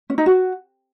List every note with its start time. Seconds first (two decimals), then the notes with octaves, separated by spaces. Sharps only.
0.10 C#4
0.18 D#4
0.26 F#4